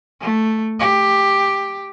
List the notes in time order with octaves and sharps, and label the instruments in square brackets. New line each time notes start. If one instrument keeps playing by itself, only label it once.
[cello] A3
G4